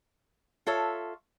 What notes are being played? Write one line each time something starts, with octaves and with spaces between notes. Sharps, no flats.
F4 A4 C#5 E5